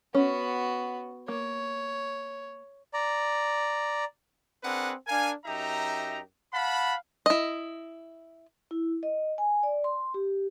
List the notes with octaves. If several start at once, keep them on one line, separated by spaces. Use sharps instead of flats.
B3 C#4 F#4
A#3 C#5
D5 A#5
C4 D4 G#4 A#4 B4 F#5
D4 A#4 F5 G#5
F#2 D#4 G4 E5 A#5
F5 F#5 A5 B5
E4 D#5
E4
D#5
G#5
D5
C6
G4